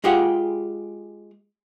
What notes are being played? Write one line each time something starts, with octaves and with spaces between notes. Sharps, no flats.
G#3 F4 G4 G#4 F#5